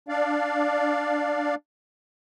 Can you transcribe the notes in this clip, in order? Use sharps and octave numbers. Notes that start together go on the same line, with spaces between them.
D4 D5 F5